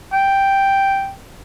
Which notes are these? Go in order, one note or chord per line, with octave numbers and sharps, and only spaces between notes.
G5